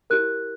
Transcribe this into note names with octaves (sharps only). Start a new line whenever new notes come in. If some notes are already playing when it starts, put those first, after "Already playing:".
E4 G4 A#4 F#6